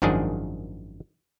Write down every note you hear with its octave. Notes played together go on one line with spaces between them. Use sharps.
G#1 F#2 D#3 F3 D4 G#4